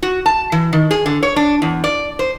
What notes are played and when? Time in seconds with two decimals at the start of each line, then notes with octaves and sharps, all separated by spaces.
0.03 F#4
0.26 A5
0.52 E3
0.73 D#3
0.91 G#4
1.06 D3
1.23 C#5
1.36 D4
1.62 E2
1.84 D5
2.19 C5